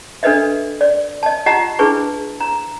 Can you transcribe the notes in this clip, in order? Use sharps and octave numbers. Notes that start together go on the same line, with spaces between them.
D4 A4 B4 D#5 E5
D5
D#5 A5
F4 G4 D#5 F#5 A5 A#5
D4 E4 G#4 B4 A5 C#6
A#5